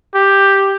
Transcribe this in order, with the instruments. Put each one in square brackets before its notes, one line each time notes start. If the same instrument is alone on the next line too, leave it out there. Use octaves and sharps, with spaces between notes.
[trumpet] G4